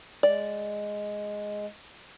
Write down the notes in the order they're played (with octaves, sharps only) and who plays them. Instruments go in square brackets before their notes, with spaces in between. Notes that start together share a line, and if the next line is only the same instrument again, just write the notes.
[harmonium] G#3 [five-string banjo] D5